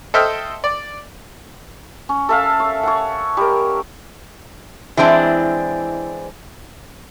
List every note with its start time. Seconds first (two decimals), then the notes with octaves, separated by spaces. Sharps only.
0.14 A4 C5 D#5 E5 G5 F6
0.64 D5
2.09 C#4
2.29 A4 E5 F5
2.60 C#5
2.83 C#5 F#5
3.37 G3 A#4
4.97 E3 G#3 C4 D4 E4